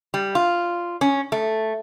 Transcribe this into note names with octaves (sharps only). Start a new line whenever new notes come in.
G3
F4
C#4
A3